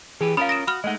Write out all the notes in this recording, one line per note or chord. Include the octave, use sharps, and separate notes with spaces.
E3 G4 G#4 B4
C#4 F4 A#4 F5 B5 D#6
A#6 D7 E7
F#4 B5 F6
G#3 A3 D#4 D#5 F#5